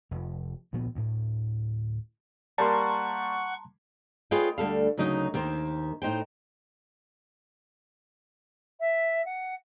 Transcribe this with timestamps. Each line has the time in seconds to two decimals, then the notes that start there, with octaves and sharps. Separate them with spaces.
0.11 F1 F2
0.73 D2 A#2 F3 B3
0.95 D2 A2
2.58 G3 A#3 F#5 A5 A#5 C6 C#6
4.31 F4 G#4 B4 C#5 D#5 G5
4.58 D2 G3 A4 F5
4.97 D2 C#3 F#3 D#4 A#4 D#5
5.34 D#2 D#3 A#4 C5
6.02 A2 D#4 C5 G5
8.80 E5
9.25 F#5